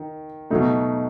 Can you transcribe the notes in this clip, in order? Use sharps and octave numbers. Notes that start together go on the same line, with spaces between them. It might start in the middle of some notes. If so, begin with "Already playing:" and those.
Already playing: D#3
B2 F#3 A3 D#4